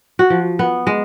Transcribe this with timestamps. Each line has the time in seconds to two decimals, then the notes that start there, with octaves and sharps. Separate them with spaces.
0.19 F#4
0.30 F3
0.59 B3
0.87 G#3